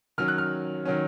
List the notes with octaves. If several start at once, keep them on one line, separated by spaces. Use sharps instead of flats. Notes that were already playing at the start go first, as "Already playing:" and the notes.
D#3 F#3 C#4 F6
F#6
F6
D#3 F#3 C#4